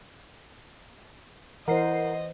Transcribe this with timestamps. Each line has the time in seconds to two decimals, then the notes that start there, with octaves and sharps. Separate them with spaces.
1.68 E3 E4 A#4 C5 D#5 F#5 C7